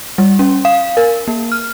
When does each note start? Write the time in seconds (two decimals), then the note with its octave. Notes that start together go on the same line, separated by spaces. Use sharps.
0.18 G3
0.39 C#4
0.65 F5
0.97 A#4
1.28 A#3
1.52 F6